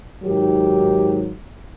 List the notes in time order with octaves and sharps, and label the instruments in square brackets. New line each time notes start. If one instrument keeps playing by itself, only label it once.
[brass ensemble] G#2 D#3 F#3 G4